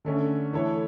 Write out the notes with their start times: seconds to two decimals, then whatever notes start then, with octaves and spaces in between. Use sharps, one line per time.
0.05 D3 A3 C#4
0.53 E3 A3 E4 A4 C#5